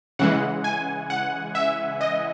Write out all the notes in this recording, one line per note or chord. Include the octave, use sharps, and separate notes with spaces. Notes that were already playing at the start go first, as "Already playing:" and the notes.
C#3 E3 G#3 F#5
G#5
F#5
E5
D#5